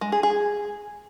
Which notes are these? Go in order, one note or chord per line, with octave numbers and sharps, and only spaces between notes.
G#3
G#4
G#4